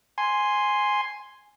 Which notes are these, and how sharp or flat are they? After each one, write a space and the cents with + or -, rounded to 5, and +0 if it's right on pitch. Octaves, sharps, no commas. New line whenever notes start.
G#5 +0 C6 +0